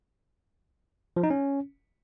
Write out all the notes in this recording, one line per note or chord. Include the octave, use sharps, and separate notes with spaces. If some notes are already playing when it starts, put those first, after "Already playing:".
F3
D#4
C#4